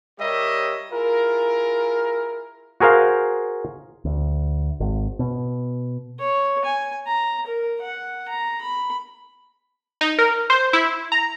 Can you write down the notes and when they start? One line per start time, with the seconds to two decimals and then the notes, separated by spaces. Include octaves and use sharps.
0.19 G3 G4 A#4 C#5 D#5 E5
0.91 E4 F4 G#4 A#4
2.80 F#4 G#4 A#4 C5 F5
4.05 D2
4.80 G#1
5.19 B2
6.19 C#5
6.64 G#5
7.06 A#5
7.46 A#4
7.81 F#5
8.28 A#5
8.61 B5
10.01 D#4
10.19 A#4
10.50 C5
10.73 E4
11.12 A#5